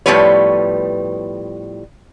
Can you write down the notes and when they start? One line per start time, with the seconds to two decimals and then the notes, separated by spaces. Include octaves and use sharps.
0.06 A2 F3 G3 B3 B4 C#5